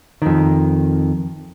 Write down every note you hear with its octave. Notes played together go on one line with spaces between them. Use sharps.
F2 D#3